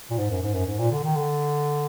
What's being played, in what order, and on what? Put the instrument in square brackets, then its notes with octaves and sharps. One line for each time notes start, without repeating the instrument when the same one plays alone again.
[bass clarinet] A#2
G#2
F#2
G#2
F#2
G#2
A#2
D3
D#3
D3